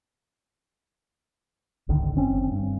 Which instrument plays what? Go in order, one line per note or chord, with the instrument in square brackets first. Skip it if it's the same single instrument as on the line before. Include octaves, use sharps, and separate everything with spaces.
[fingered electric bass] G#1 C#2 D3 D#3
F#1 C4 C#4
G2